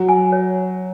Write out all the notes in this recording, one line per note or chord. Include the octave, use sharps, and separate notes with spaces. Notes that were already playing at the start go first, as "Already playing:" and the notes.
Already playing: F#3
G#5
C#5